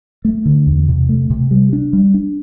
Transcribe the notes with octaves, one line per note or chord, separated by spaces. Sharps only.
A3
D3
E2
C3
A3
C3
G3
D4
G3
D4